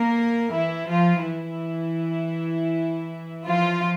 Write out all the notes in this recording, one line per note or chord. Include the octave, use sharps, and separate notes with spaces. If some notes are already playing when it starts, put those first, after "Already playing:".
Already playing: A#3 A#4
E3 E4
F3 F4
E3 E4
F3 F4